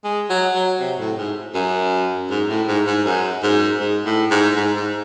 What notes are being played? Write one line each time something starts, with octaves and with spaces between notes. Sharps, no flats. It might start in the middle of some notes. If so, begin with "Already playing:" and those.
G#3
F#3
F#3
C3
A2
G#2
F#2
G#2
A2
G#2
G#2
F#2
G#2
G#2
A2
G#2
G#2
G#2